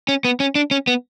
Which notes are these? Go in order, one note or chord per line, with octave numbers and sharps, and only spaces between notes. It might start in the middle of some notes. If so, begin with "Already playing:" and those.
C#4
B3
C#4
D4
C#4
B3